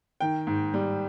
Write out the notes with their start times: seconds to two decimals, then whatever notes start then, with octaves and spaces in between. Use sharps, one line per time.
0.20 D#3 G5
0.47 G#2
0.74 G3